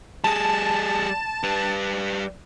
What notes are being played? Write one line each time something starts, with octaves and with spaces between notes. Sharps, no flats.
G3 G#4 A5
G3 B4